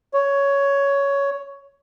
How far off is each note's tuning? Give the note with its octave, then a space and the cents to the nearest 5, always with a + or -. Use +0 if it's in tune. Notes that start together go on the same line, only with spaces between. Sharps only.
C#5 +10